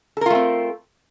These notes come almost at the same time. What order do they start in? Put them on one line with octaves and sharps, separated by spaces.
A4 A#4 F4 A3 C4